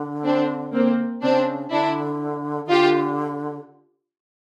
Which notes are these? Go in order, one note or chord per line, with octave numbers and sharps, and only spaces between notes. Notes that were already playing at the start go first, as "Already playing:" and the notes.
Already playing: D3
C4 D4
A#3 C4
C#3 C4 D4
D3 D4 E4
D#3
D3 F4 G4